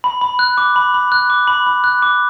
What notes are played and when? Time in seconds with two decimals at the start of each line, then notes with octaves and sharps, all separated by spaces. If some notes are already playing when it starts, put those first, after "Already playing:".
0.04 B5
0.21 B5
0.39 F#6
0.57 D6
0.76 B5
0.94 B5
1.12 F#6
1.30 D6
1.47 B5
1.66 B5
1.84 F#6
2.02 D6